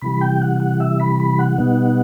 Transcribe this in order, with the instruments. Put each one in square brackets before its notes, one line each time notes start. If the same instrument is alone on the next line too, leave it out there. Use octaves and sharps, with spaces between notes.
[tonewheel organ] C3 E3 G3 B5
G5
F#5
F#5
E5
B5
B5
F#5
B2 G3 B3 D#4